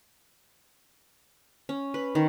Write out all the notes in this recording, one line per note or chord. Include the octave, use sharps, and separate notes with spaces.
C#4
B4
D#3